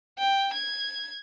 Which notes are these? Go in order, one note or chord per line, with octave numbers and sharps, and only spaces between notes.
G5
G#6